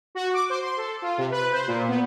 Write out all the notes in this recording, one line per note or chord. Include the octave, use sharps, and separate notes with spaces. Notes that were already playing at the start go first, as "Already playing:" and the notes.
F#4
D6
C5
C6
A4
F4
C3
B4
C5
A#2
B3